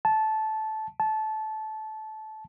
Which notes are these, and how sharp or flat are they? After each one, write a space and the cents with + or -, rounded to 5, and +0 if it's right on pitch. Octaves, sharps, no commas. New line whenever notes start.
A5 -15
A5 -20